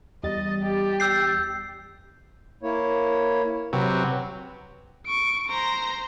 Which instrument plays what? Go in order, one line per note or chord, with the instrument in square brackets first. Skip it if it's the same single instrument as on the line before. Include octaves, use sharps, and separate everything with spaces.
[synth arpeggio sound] E2 G3 A6 [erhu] D#5
[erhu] G4
[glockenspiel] E6 G6 C7
[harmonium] A#3 E4 C#5
[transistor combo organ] C3 F#3 [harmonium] B4
[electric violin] C#6 D7
C5 A#5